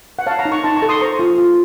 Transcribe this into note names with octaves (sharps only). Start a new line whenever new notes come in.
F#5
C#5 F5 A5
F#5 A#5
D#4
A#5 C#6
D#4 A5 C6
A#5 C#6
A4
C6 D#6
C5 A#5 C#6
F4
F4